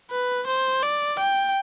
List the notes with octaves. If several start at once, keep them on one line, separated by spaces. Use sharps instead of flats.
B4
C5
D5
G5